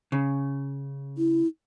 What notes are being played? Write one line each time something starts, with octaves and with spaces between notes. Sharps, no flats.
C#3
E4